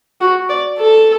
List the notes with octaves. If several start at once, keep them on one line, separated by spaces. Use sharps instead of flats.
F#4
D5
A4